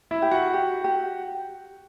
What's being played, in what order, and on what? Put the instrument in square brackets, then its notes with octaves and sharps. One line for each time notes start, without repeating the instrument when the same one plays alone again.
[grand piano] E4 E5
[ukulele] G4
[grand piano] F#4 F#5
[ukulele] G4
G4